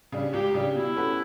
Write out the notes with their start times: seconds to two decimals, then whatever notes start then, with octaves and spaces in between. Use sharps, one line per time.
0.12 C#3 G3 D4
0.33 C#2 G4
0.54 C#3 G3 D4
0.75 B2 E4
0.96 A3 C#4 F#4 B4